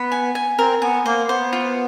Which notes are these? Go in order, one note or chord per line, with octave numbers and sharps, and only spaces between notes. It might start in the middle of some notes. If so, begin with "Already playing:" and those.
Already playing: B3 B5
G#5
G#5
C4 A#4
B3 G#5
A#3 C5
B3 C5
F4